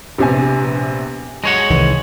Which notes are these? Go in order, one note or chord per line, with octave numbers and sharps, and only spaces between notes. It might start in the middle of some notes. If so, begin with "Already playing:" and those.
A#1 C3 B3 G4 G#5
G#3 C#5 F#5 A#6
C2 D#3 E3